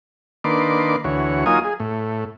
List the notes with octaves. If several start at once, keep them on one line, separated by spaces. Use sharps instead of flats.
D#3 A#3 D4 B4 C6 D6
D2 E3 F#4 C#5
F#3 A#3 D#4 F4 G#5 D#6
G#4
A2